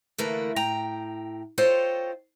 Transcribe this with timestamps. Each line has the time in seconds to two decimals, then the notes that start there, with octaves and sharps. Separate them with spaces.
0.18 D3 E3 A3 A#3 A#4 B4
0.56 A2 G5 A#5
1.58 F4 A4 C5 C#5 D#5 G5